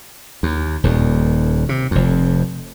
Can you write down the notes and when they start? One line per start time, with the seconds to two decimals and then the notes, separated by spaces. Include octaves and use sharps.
0.43 D#2
0.83 D#1 D#2
1.69 C3
1.91 F1 F2